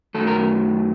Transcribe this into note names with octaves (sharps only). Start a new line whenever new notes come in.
F#2 D#3 F#3 A3 A4
A#4